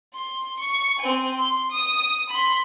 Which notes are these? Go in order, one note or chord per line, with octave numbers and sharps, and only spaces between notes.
C6
C#6
C4 G#5
C6
D#6
B5 C6